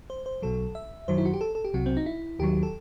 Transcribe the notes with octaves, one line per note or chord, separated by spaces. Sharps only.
C5
C5
B1 B2 F#3 A4
E5
F#2 D#3 F#3 C5
E4
F#4
G4
A4
A4
G4
C2 C3 F#3 F#4
C4
D#4
E4
D#2 D#3 F#3 G4
A4